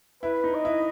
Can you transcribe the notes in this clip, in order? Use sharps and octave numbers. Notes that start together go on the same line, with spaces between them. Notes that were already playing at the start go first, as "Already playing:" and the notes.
E4 B4
D#4
D#5
E4